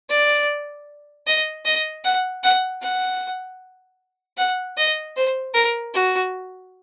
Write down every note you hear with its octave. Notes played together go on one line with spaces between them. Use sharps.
D5
D#5
D#5
F#5
F#5
F#5
F#5
D#5
C5
A#4
F#4